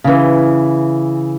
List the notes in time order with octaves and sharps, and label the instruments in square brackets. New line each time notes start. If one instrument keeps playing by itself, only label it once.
[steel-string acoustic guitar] C#3 E3